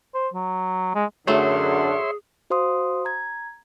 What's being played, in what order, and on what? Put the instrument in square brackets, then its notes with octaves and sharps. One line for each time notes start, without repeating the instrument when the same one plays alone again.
[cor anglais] C5
F#3
G#3
[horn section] F#2 D3 [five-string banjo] F#3 A3 [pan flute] G#4 [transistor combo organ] C#5 E5 C6
[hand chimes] F#4 C5 F5 C6 D#6
A#5 G#6